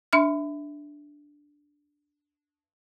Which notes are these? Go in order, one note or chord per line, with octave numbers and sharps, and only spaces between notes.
D4 E5 C6 F6